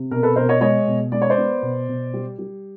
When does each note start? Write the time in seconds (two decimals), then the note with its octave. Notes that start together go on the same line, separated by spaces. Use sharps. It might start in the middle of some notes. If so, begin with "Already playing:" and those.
Already playing: C3
0.11 B2 A#4
0.23 A4 B4
0.35 B2 A#4 C5
0.49 C#5 D#5
0.61 G#3 C#5 D#5
0.87 B2
1.12 G#3 D5
1.22 C#5
1.30 C5 D5
1.38 B3
1.62 B2
1.89 B2
2.14 G3
2.39 G3